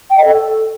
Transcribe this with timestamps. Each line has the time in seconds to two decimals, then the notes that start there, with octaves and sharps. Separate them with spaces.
0.10 G5
0.17 D#5
0.24 A4